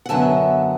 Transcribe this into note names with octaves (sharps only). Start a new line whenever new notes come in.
F#5
F#2 D3 F#3 B3 E5 A5